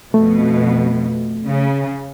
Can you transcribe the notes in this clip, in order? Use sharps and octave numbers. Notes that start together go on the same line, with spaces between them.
F2 B2 A3
C#3